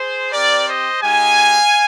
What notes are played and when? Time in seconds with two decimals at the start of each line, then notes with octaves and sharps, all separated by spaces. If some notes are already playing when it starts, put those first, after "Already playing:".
Already playing: G#4 C5
0.32 C4 G4 A#4 D5
0.67 C5 D#5
1.03 G#3 D#4 G4 F5 G#5